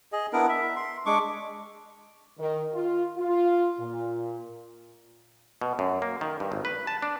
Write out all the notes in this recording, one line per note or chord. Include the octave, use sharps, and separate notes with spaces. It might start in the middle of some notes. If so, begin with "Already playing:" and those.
G#4 D#5
B3 D4 E4 A#4
E5
C6
G#3 D4 C#6 D6
D#3
F4
F4
A#2
B2
F#2
A#3
D#3
G2
G#1
B4
A5
D4